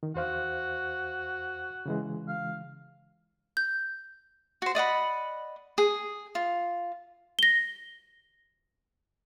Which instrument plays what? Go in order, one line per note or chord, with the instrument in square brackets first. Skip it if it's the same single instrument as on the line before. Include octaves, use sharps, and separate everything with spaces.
[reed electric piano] D#3
[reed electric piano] E2 C5 F5 [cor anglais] F#4
[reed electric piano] C#3 E3 G#3
[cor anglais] F5
[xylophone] G6
[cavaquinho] F#4 C5
D5 D#5 F#5 B5
G#4
F4
[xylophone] A#6 G7